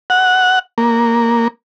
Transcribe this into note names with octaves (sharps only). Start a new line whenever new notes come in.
F#5
A#3